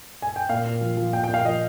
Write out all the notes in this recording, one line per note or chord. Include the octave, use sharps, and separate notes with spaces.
G#5
G5
A#2 F5
A#2
F3
F3
A#2 G5
G5
A#2
F5
F3 D#5